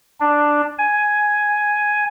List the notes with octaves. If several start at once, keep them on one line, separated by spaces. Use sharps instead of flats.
D4
G#5